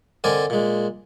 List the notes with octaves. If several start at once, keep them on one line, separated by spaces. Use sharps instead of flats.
D3 C4 A#4 D5 D#5 G#5
A#2 G#3